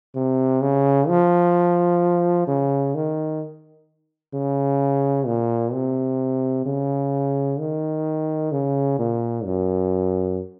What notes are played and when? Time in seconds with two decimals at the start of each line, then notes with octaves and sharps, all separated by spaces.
0.15 C3
0.62 C#3
1.08 F3
2.47 C#3
2.95 D#3
4.34 C#3
5.27 A#2
5.73 C3
6.66 C#3
7.59 D#3
8.52 C#3
8.99 A#2
9.45 F#2